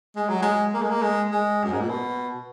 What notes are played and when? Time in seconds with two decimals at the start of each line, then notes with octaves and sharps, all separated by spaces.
0.16 G#3
0.29 F#3
0.42 G#3
0.74 A#3
0.82 G#3
0.90 A#3
1.02 G#3
1.31 G#3
1.64 F#2
1.73 G#2
1.80 A#2
1.89 B2